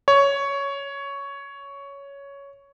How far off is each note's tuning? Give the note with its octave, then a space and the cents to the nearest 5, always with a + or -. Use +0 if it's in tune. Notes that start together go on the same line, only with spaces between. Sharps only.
C#5 +10